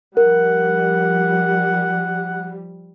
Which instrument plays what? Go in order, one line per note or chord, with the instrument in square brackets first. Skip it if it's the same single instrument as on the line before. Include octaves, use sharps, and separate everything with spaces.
[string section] F3 G3 [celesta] A#4 [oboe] F#5